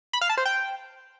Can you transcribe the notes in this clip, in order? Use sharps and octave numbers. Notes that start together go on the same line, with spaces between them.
B5
F5
A5
C5
G5